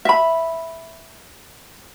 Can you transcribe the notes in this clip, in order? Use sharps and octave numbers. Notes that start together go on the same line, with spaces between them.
E5 B5